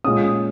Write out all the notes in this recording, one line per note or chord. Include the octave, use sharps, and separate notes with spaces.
A#2 G#3 C#4 D#6